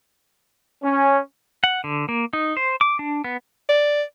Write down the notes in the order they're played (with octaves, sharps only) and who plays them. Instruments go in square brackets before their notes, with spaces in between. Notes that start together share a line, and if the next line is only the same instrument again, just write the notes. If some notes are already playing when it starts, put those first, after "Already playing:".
[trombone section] C#4
[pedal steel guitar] F#5
D3
A#3
D#4
C5
D6
D4
B3
[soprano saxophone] D5